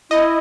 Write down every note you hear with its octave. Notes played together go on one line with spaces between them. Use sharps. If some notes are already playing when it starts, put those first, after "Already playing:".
E4 D#5